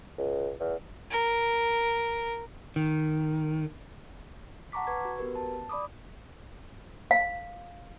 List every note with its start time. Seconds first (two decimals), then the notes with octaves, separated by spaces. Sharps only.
0.18 C#2
0.60 E2
1.11 A#4
2.76 D#3
4.72 F#5 A5 A#5 C#6 D6 B6
4.87 B4 C#6 G#6
5.05 F#4
5.18 B3 F#4 G4 A#4 B4
5.35 A5
5.69 D5 B5 D6 D#6
7.11 F5